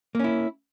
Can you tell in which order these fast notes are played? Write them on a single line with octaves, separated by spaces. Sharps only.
A#3 C#4 E4